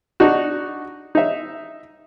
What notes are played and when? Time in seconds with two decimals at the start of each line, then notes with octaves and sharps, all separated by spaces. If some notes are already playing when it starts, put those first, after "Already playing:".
0.20 D4 D#4 F#4
1.15 D#4 E5